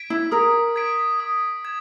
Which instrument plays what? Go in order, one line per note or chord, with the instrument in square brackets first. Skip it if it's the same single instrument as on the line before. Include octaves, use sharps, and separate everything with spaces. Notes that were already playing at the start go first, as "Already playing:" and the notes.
Already playing: [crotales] G#6 B6 D7
[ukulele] E4
[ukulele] A#4 [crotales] D#6
[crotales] G#6 B6 D7
D#6
G#6